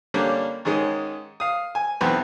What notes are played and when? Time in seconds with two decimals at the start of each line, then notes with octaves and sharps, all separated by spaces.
0.14 D3 G3 A#3 C#4 D4
0.65 G#2 D#3 G#3 C#4 D#6
1.40 F5 D#6
1.75 G#5
2.01 B1 E2 B3 C4 B4